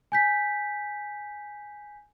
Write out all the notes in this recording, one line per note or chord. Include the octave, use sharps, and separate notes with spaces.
G#5 G6 B6